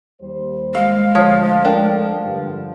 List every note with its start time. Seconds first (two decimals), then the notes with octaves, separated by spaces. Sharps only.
0.22 D#2 G3 C5
0.75 G#3 F5
1.15 D2 D3 F3 A3 C#5
1.65 F2 A3 D4 A#4 G5
2.24 G2 D3